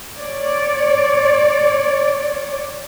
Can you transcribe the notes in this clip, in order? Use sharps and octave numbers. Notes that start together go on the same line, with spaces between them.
C#5 D5